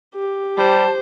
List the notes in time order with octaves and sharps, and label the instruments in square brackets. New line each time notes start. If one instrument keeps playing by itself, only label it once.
[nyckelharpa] G4
[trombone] G3 [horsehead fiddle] C5 [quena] A5